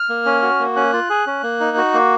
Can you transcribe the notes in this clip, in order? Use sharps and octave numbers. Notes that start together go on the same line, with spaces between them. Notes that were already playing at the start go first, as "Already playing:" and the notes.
Already playing: F6
A#3
C#4
F#4
A#3
C#4 F#6
F4
G#4
C#4
A#3
D#4
F#4
A#3